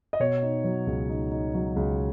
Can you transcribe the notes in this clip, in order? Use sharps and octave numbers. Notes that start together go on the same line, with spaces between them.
D#5
B2 C#5
D#4
F#3
C#2
D#4
D#4
F#3
C#2